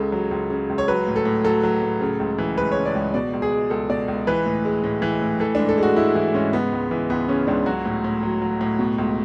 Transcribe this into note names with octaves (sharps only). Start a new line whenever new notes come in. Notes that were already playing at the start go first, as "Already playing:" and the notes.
Already playing: C#2 C#3 A4
F#3
C#2
C#3
C#2
C#5
F#3 B4
A2
A4
A2
F#3 A4
F#3
A2
C#3
C#2
E3
G#3 B4
C#3 C#5
D5
C#2
B2 D5
C#2
G#4
G#3
C#2 A4
B2 D5
C#2
E3 B4
A2
G#3
A2
E3
A2
E3 A4
G#2 D4
A4
G#3 F#4
G#2 E4
E3 E4
G#2 C#4
C#3 B3
C#2
E3
C#2 B3
C#3 C#4
C#2 D4
F#3 F#4
A2
A2
F#3
F#3
A2
B2
C#2